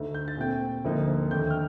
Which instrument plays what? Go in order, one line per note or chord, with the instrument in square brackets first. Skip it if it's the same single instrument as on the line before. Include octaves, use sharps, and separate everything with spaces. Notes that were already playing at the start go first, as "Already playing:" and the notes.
Already playing: [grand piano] D2 D3 A3 D#4
G6
A6
A#2 A3 C4 G5 G6
D2 D3 F3 A#3 D#4
D#2 D3 A3 D#4 G5 G6
F6